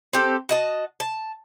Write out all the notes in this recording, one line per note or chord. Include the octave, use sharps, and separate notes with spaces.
C4 G4 A4
F#4 D#5 A5
A5